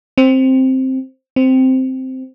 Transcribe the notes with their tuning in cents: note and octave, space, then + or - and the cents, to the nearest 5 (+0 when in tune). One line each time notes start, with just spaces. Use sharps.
C4 +5
C4 -5